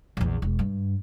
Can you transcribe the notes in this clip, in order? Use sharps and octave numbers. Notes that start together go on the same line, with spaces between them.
A#1 E2
E1
G2